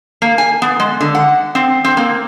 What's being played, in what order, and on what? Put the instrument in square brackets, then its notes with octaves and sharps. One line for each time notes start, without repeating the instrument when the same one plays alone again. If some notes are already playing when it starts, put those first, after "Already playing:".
[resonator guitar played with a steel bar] A#3
G#5
B3
G#3
D3
F#5
C4
C4
A#3